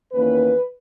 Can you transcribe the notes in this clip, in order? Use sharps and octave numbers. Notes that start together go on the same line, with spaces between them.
E2 D#3 A#3 C#4 B4